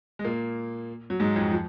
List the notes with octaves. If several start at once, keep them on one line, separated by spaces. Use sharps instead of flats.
G#3
A#2 A#3
F#3
G#2 G#3
F2 F3
F3